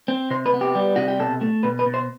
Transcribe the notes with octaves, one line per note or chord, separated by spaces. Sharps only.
C4
C3 C5
B4
B3
G4
G3
C3 F#4
G4
B2 A4
A3
B2 B4
B4
B2
C5